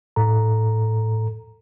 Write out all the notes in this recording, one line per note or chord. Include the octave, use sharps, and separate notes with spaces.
A2 A4 A#5